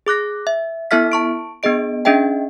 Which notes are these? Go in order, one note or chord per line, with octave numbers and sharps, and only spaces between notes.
G#4 D6 F#6 A#6
E5
B3 E4 A4 E5 F6 B6
A5 C#6 D7
B3 D4 G#4 D#5 D7
C#4 D4 G#4 D#5 E5 G5